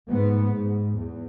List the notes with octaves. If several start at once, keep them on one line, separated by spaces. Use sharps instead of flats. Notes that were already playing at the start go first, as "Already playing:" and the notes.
G#2 B3
G#2
E2